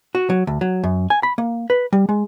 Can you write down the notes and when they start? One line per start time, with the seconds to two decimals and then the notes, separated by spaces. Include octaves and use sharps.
0.15 F#4
0.30 F#3
0.47 D2
0.61 F#3
0.84 F#2
1.10 G#5
1.23 B5
1.38 A#3
1.70 B4
1.93 G3
2.09 G#3